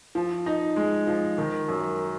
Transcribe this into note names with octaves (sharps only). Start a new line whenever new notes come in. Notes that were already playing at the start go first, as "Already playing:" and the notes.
F3
D#4
G#3
F3
D#3
F#2